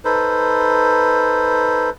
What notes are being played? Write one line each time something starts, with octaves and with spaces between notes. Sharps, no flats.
D#4 A4 B4 C5